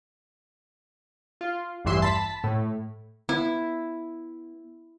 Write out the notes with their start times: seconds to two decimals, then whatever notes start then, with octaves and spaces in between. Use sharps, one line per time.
1.41 F4
1.85 A1 E2 G2 E3 E5 C6
2.02 A5 B5 B6
2.44 A2
3.29 B3 E4